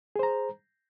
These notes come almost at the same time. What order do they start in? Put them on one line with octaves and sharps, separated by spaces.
G#4 C5 A#5